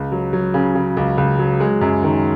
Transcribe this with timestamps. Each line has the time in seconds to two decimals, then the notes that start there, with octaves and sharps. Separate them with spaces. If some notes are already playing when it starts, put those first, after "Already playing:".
Already playing: C#2
0.12 F#3
0.33 F#3
0.54 C#3
0.75 C#3
0.97 C#2
1.18 C#2
1.39 F#3
1.60 G#3
1.81 F#2
2.03 D#3